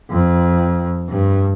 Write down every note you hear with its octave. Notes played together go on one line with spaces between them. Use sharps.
F2
G2